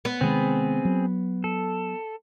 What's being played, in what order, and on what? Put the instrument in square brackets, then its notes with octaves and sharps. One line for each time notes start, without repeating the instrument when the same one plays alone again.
[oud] B3
[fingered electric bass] C3 D#3 G#3 [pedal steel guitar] C4 G#4
[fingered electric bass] F#3
[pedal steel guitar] A4